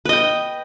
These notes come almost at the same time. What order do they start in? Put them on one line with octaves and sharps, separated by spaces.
B4 D#5 G5